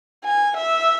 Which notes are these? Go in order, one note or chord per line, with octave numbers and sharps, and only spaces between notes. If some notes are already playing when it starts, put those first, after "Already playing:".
G#5
E5